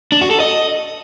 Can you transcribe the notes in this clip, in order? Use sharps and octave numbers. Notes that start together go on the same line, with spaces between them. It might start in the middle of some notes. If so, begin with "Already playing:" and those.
D4
F#4
A4
D#5